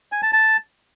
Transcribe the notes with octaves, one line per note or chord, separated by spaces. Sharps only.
G#5
A5
A5